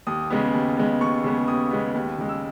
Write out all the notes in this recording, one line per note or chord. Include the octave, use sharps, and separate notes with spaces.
D#2 D#6
C#3 G#3 B3
D#2
C#3 G#3 B3
D#2 C#6
C#3 G#3 B3
D#2 D#6
C#3 G#3 B3
D#2
C#3 G#3
E6